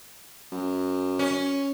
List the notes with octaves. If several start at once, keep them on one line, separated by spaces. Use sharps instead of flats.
F#2
C#4